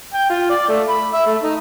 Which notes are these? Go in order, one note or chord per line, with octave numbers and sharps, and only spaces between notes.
G5
F4
D5
A3
B5
E5
A3
D#4